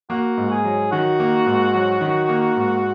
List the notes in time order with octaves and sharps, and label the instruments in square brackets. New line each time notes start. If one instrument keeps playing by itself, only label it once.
[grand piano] A#3 [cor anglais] F#4
[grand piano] G#2
[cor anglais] G#4
[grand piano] F#3
[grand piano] D#3 [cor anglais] F#4
[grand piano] A#3
G#2
F#3
D#3
A#3
G#2